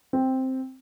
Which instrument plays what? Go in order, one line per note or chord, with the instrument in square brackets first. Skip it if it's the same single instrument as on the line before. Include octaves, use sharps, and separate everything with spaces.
[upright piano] C4